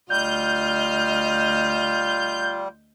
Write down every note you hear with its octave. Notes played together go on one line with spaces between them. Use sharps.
D2 G3 F4 D#5 F6 G6